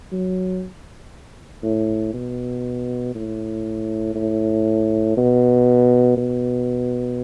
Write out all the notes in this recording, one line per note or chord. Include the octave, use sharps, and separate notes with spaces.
F#3
A2
B2
A2
A2
B2
B2